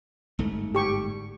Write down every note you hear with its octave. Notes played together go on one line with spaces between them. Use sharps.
G1 G#2 A3
G4 C#6